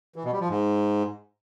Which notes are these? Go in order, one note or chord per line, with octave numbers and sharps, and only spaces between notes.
E3
B2
G3
F3
G#2